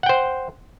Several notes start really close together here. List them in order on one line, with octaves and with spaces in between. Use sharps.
F#5 G5 C5